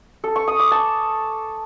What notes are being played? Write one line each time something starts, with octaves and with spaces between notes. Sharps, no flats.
A4
C#6
D#6
D6
A5